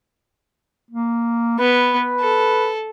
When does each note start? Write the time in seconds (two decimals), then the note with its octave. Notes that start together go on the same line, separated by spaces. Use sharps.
0.91 A#3
1.59 B3 B4
2.20 A4